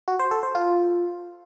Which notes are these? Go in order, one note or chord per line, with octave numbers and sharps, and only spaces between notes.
F#4
C5
A4
C5
F4